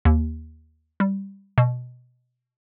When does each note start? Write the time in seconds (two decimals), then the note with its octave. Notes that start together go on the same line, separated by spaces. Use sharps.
0.05 D#2
1.00 G3
1.58 B2